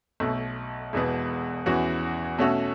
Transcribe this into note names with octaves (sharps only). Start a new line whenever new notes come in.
B1 B2 A3
E1 E2 B2 B3
E2 E3 C#4 F#4
B2 A3 C#4 F#4 A4